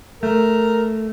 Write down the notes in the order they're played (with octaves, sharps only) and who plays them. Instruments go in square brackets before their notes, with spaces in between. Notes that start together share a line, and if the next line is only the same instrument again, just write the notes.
[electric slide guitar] A3 [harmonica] A#4